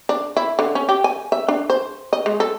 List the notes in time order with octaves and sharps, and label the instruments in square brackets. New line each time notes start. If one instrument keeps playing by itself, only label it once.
[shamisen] D4
E4
D3
C#4
G4
G#5
E5
D4
C5
D#5
G#3
A4